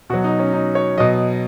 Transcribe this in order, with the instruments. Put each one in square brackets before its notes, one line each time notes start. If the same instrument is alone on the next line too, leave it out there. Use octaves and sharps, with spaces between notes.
[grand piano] B2 F#3 F#4
D#4
C#4
D#4
C#5
B2 F#3 D#5